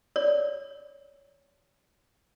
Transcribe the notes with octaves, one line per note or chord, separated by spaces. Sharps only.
C#5 D5